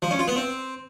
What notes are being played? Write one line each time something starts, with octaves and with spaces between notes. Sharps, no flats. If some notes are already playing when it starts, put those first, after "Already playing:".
F3
C#4
F4
B3
C4